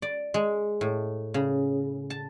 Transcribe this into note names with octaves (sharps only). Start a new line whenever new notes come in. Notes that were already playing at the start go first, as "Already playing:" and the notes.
D5
G#3
A2
C#3
A5